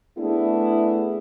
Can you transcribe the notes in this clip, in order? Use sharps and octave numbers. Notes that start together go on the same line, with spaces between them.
A3 B3 D4 E4 G#4